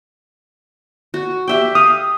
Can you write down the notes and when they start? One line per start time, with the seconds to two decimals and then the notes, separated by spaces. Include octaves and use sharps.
1.14 F#4
1.48 G4 E5 G5
1.75 F5 D#6